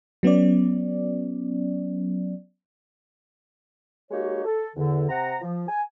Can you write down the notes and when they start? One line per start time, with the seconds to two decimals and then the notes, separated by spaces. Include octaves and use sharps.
0.23 F#3 B3 C#4 D5
4.11 G#3 A#3 D#4 F#4 G4 C#5
4.45 A4
4.76 E2 D3
5.09 C3 F#5 A#5
5.41 F3
5.68 G#5